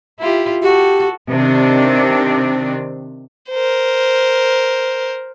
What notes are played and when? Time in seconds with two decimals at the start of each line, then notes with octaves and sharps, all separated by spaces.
0.19 E4 F4 G4
0.62 F#4 G4 A4
1.30 C3 D#3 C4 D4
3.50 A#4 C5